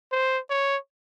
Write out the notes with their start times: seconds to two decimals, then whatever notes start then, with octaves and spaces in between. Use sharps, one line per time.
0.12 C5
0.50 C#5